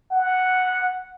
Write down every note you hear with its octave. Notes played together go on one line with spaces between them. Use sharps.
F#5